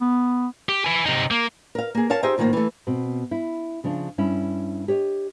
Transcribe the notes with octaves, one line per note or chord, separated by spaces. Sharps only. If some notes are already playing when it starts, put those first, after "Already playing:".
B3
G4
B4 G#5
C3 D#4
A#3
A#4 F5
A#3 G#4
A#4 C#5 F5 A5
D#4 G4 G#4 C5 D#5 E5
A2 D#3 F3 G3 A#3
E3 A3
B2 C4
E4
C#3 F3 D4
G2 C#4 E4
G4 C#5 D#5